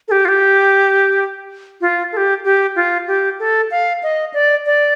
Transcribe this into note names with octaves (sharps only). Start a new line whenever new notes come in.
A4
G4
F4
G4
F4
A4
G4
G4
F4
G4
A4
F5
D#5
D5
D5